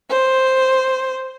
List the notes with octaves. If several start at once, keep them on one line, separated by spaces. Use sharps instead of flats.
C5